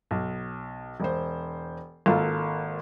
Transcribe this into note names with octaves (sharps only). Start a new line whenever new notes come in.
B1
E1 C5
G#1 A#3 F4 A4